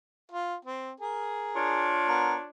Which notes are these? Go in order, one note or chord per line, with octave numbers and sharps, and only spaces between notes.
F4
C4
G#4 A#4
D4 F4 C#5
B3 A#4